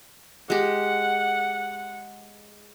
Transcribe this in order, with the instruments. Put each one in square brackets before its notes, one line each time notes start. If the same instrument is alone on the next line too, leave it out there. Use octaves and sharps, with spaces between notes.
[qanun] G#3 G4 [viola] F#5